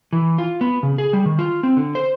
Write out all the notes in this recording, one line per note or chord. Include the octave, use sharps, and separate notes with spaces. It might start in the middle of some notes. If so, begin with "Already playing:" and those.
E3
F4
B3
C#3
G#4
G3
D#3
F4
C4
D3
C5